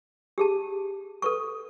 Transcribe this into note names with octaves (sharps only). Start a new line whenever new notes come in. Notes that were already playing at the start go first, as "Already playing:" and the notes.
G4 G#4 A5
A4 B4 C#6